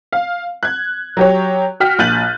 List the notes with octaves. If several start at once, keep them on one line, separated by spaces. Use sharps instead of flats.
F5
F#6 G#6
F#3 G4 C#5
F#4 G5 F6 B6
A#1 F#6 G6 A6 D#7 F#7